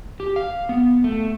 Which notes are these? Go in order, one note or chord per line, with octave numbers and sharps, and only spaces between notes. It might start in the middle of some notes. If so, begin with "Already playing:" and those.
G4
F5
B3
A3